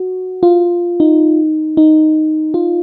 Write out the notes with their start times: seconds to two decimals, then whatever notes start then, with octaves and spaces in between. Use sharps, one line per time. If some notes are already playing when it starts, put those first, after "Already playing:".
Already playing: F#4
0.43 F4
1.00 D#4
1.77 D#4
2.54 F4